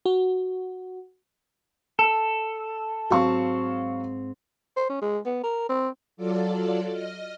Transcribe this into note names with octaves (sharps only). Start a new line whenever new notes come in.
F#4
A4
G#2 F#3 C4 F5 C#6
C5
C#4
G#3
B3
A#4
C4
F#3 F4 A4 D5
D#5 F6